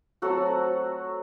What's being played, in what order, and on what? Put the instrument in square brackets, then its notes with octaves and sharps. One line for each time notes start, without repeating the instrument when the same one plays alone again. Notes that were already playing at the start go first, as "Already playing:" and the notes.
[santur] F#3 A3 C4 F#4 A4